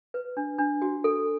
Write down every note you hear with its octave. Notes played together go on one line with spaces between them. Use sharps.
B4
D4
D4
F#4
A4